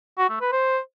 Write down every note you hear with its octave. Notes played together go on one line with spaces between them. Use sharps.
F#4
A3
B4
C5